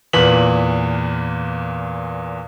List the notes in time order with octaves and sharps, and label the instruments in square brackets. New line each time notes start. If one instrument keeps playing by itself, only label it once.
[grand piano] E2 A#2 B4 B6 F#7